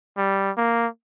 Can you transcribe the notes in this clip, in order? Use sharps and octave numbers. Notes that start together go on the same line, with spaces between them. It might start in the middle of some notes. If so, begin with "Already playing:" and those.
G3
A#3